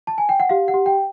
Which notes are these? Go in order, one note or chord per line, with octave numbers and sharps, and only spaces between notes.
A5
G#5
G5
F#5
G4 F5
F#5
G4
G5